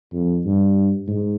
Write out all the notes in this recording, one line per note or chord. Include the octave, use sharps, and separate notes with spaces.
F2
G2
G#2